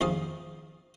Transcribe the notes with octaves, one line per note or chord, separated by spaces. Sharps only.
D#2 F3 G#4 F5